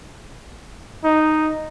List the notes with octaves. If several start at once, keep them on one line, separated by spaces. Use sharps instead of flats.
D#4